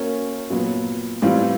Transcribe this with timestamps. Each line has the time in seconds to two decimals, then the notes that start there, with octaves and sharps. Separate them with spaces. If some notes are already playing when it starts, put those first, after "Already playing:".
Already playing: A#3 C#4 F#4 A#4 C#5
0.50 A#2 F#3 B3
1.22 A2 E3 G3 C4 F4